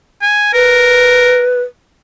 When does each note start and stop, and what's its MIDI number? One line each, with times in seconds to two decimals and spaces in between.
0.22 0.53 80
0.53 1.43 70
0.53 1.62 71